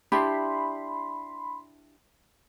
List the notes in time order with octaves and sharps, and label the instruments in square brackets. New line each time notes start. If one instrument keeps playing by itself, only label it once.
[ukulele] D4 E4 G4 [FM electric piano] B5 C6